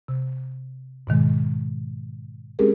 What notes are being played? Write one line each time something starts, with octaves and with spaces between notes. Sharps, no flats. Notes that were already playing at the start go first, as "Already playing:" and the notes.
C3
G#2 B2 D#3 G#3
G#3 C4 C#4 G4 G#4 A#4